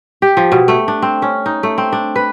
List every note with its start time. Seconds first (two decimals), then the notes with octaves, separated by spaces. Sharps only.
0.22 G4
0.37 F3
0.52 B2
0.68 A3
0.88 D4
1.02 C4
1.22 C#4
1.46 D#4
1.63 A3
1.78 C4
1.93 D4
2.16 B4